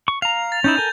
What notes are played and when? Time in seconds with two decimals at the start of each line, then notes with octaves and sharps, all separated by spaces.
0.08 C#6
0.22 F5 A#5 F7
0.52 A6
0.64 C#4 D#4 E4 G6
0.77 A4 A#4 G#5